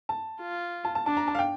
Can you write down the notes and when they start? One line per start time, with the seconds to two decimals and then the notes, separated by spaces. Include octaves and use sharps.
0.09 A5
0.41 F4
0.85 A5
0.95 A5
1.06 D4 A5
1.17 A#5
1.28 A5
1.35 F5
1.39 G5